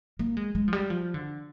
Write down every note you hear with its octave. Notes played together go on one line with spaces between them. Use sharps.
A#3
G#3
G#3
F3
G3
F3
D3